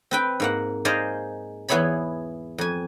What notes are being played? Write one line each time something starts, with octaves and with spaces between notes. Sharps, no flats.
C4 B4 G5
G#2 A#3 F#5
D#4 G#4 C5 D5 D#5 F5
E2 B3 E4 G#4 C#5 B5
F2 G#5